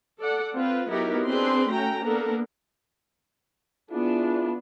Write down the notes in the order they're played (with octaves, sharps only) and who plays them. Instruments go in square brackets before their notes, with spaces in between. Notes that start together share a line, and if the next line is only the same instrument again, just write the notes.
[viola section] A4 D5 F#5
C4 F4 B4
F#3 B3 D#4 E4 G4 A#4
C4 D4 G#4 B4 C6
A3 C#4 F#4 G5 A#5
A#3 B3 D4 A4 A#4
[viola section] B3 D4 [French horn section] E4 F4 G#4